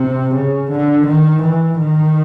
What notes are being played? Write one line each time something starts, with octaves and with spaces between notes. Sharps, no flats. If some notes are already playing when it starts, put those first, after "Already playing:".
Already playing: C3
C#3
D3
D#3
E3
D#3